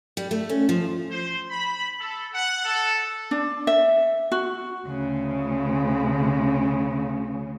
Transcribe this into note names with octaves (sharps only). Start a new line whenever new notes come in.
G3
A3
C#4
F3
C5
B5
A4
F#5
A4
D4
E5
F#4
D2 C#3